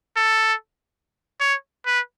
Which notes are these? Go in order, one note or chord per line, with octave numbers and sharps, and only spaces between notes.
A4
C#5
B4